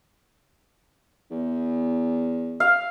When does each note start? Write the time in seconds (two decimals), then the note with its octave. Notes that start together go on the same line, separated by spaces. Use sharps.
1.31 E2
2.60 F5